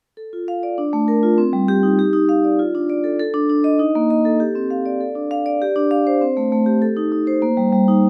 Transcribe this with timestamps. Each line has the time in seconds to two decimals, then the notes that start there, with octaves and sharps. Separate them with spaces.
0.17 A4
0.33 F4
0.48 F5
0.63 D5
0.78 D4
0.93 A3
1.08 A#4
1.23 F4
1.38 C4
1.53 G3
1.68 G4
1.83 D#4
1.99 G4
2.13 D#4
2.29 F5
2.44 D5
2.59 F4
2.75 D4
2.90 D5
3.04 A4
3.20 A4
3.34 D4
3.50 D4
3.64 D#5
3.79 D#4
3.95 A#3
4.10 D#5
4.25 A4
4.40 G4
4.55 C4
4.70 F5
4.86 D5
5.01 A4
5.15 D4
5.31 F5
5.46 D5
5.62 G4
5.76 D4
5.91 F5
6.07 C5
6.21 C4
6.37 A3
6.52 A3
6.66 G4
6.82 A4
6.97 D#4
7.12 D#4
7.27 C5
7.42 A#3
7.57 G3
7.73 G3
7.88 D#4